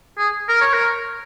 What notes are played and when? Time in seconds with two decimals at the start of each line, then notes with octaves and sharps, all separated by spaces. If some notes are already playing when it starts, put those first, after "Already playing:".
0.18 G#4
0.49 A#4
0.61 C#5
0.73 A#4